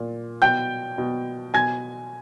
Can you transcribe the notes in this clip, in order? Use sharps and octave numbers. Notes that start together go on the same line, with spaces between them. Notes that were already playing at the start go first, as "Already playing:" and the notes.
Already playing: A#2
B2 G5 G6
B2
B2 G#5 G#6